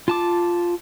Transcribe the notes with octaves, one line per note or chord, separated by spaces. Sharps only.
F4 A5 D6